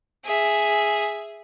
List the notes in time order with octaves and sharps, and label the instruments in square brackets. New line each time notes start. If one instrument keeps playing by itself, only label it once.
[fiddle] G#4 E5